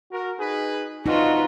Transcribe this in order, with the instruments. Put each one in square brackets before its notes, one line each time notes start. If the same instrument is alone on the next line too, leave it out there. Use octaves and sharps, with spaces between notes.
[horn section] F#4 A#4
D#4 G#4 B4
[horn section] C4 D4 F#4 [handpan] D#4 [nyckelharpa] F4 B4